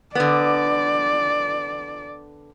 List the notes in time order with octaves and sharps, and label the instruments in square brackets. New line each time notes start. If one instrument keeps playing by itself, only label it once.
[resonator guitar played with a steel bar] D3 B3 [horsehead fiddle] D5